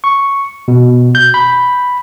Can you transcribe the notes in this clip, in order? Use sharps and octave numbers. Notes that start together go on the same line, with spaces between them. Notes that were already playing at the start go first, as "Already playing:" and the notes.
C#6
B2
G6
B5